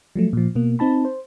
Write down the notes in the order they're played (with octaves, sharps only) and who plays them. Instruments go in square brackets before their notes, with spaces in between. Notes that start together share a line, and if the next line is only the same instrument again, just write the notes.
[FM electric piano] F3 F#3 A3
A#2 F3
B2 A#3
C4 D#4 A5 B5
C5